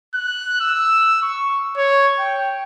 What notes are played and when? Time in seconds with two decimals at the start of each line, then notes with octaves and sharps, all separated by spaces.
0.14 F#6
0.61 E6
1.22 C#6
1.77 C#5
2.19 G5